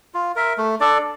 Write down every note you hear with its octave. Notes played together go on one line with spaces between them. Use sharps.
F4
A#4 E5
A3
D4 A4 D5